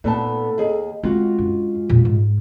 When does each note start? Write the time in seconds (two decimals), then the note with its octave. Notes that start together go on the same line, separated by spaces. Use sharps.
0.04 A#2 B3 D#4 A4 A5
0.58 D#2 G#4
1.03 G#3 C4 F4 F#4
1.39 F#2 D4
1.89 E2 A#2
2.05 G#2